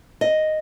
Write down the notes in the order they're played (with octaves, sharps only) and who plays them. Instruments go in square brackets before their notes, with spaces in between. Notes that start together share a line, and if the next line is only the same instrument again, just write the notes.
[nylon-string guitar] D#5